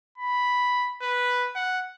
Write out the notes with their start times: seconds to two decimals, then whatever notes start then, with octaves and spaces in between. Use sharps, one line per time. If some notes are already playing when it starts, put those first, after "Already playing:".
0.18 B5
1.02 B4
1.56 F#5